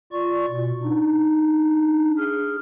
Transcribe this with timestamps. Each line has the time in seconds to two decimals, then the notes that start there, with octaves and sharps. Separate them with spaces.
0.12 F4 D5 C#6
0.49 B2
0.83 D4 D#4
2.17 G#4 F6